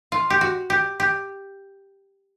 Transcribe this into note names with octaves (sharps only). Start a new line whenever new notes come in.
F4
G4
F#4
G4
G4